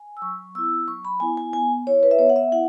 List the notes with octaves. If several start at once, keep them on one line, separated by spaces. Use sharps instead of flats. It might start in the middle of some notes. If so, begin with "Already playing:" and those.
Already playing: G#5
E6
F#3 C#6
B3 E4 E6
F#3 C#6
B5
B3 E4 G#5
G#5
B3 G#5
E4 C#5
B4
E5
B3 C#5
F#5
E5
E4 F#5